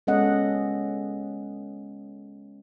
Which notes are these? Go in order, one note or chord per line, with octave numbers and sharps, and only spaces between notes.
G#3 B3 C#4 A4 D#5 F#5